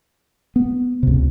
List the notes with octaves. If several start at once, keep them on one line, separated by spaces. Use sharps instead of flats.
B3
C#2 C3